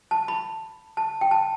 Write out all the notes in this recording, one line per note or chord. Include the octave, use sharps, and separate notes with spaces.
A5
B5
A5
G5
A5